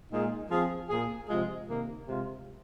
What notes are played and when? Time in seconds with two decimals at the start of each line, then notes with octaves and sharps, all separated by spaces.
0.11 A#2 G#3 D#4 G#4
0.49 F3 C4 G#4
0.89 A#2 A#3 G#4
1.28 C3 F3 G#3 F4 G#4
1.67 C3 D#3 A#3
2.06 C3 G#3 F4